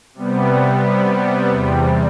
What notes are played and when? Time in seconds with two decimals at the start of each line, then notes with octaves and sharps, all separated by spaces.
0.14 C3 G3 B3
1.49 E2 C3 G3